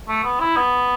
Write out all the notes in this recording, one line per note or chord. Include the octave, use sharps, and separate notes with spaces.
A3
B3
E4
B3